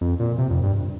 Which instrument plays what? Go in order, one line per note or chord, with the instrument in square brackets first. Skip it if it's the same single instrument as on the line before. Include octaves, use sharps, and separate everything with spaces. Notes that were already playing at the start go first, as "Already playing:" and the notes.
[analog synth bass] F2
A#2
C3
F2
G2